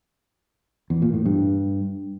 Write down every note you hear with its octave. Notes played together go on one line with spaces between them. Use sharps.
E2
A#2
A2
G2